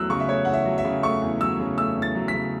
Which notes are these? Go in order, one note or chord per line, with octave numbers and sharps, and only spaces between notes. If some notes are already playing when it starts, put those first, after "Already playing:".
Already playing: E2 F#3 A3 E6 F#6
C#3 C#6
E5
A3 C#5
E2 F#5
E5
F#3
E5
C#3
A3 C#6
E2
F#3 E6
C#3
A3 E6
E2
A6
F#3
B6
C#3